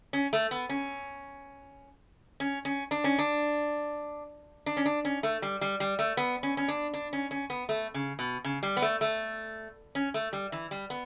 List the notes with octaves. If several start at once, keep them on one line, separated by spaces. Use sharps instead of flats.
C#4
A3
B3
C#4
C#4
C#4
D4
C#4
D4
D4
C#4
D4
C#4
A3
G3
G3
G3
A3
B3
C#4
C#4
D4
D4
C#4
C#4
B3
A3
C#3
B2
C#3
G3
B3
A3
A3
C#4
A3
G3
E3
G3
B3